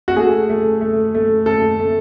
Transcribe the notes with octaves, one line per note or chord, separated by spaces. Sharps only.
F#4
A3 G#4
A3
A3
A3
A3 A4
A3